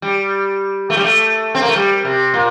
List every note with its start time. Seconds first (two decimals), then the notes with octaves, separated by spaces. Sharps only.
0.02 G3
0.90 A3
0.97 G3
1.04 A3
1.55 C4
1.62 A#3
1.68 A3
1.76 G3
2.05 C3
2.34 A#2